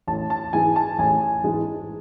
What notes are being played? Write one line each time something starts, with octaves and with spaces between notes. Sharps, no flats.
A1 A5
A5
G#2 E3 G#3 G#5
A5
A1 G#5
G#2 E3 G#3